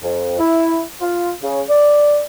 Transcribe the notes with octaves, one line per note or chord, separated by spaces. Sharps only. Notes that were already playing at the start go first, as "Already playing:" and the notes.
F2
E4
F4
C#3
D5